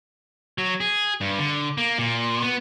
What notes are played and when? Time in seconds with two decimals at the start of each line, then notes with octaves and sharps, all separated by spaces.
0.58 F#3
0.80 G#4
1.21 G2
1.39 D3
1.78 A#3
1.98 A#2
2.42 B3